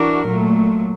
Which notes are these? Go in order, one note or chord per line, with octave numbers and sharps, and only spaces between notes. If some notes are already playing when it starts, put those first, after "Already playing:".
Already playing: E3 D4 F#4 A#4
A#2 F#3 A3